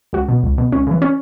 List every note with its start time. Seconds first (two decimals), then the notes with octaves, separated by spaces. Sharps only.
0.13 C#2 F#4
0.29 B2
0.43 C#2
0.58 B2
0.72 C#2 C#4
0.87 C#3 E3
1.02 C#4